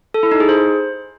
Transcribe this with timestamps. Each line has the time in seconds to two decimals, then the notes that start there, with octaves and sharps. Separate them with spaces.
0.14 A4
0.23 E4
0.32 D#4
0.40 G#4
0.49 C5